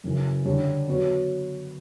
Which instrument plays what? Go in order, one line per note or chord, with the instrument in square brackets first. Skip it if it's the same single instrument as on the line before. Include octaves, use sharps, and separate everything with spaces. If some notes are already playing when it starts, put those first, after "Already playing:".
[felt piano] F#2 C#3 E3
D3 G3 D4 G4 C#5
F#3 B3 F#4 C#5